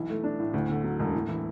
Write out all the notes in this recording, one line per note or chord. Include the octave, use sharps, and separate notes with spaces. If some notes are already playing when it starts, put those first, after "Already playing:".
Already playing: B1 E3
A3
D4
A2
D2
D3
F#3
E1
A2
E3